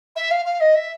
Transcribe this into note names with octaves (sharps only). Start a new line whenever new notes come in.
E5
F5
F5
D#5
E5